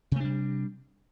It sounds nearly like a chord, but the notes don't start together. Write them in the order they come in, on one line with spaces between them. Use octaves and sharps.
C3 A3 D4 G3